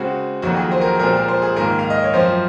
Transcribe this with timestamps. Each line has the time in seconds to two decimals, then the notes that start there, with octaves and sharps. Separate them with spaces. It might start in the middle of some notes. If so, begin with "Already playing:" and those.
Already playing: C#3 G#3 C4 F#4
0.42 F2 D#3 F#3 A#3 F#4
0.56 G#4
0.71 C5
0.81 A#4
0.91 G#4
0.99 A#2 F3 G#3 C4 A#4
1.16 A#4
1.28 C5
1.42 G#4
1.56 G#2 D#3 A#3 A#4
1.79 F5
1.90 D#5
2.03 C#5
2.13 F#2 F3 C4 C5